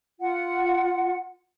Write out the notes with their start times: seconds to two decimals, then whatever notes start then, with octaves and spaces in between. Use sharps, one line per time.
0.20 F4 F#5